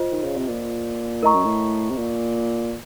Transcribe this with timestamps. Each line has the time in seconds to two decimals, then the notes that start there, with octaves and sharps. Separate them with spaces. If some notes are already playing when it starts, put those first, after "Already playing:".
Already playing: F4 C5 D#5
0.11 D#3
0.23 C#3
0.37 C3
0.48 A#2
1.23 A2 A#4 D#5 A#5 C#6
1.33 F#2
1.44 A2
1.90 C3
1.97 A#2